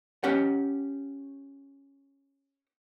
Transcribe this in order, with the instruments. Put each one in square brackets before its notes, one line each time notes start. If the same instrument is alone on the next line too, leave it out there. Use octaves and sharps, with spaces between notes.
[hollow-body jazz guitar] C#4 G4 F#5